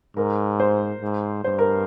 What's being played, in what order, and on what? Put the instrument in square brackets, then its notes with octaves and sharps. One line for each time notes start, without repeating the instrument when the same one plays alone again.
[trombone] G#2 [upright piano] A#4
[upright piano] C5
[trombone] G#2
[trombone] G2 [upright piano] C5
[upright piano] A#4